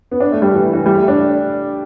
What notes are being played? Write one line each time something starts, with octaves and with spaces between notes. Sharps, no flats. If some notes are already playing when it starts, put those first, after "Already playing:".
B3
D4
A3
G3
E3
E3
G3
A3
D4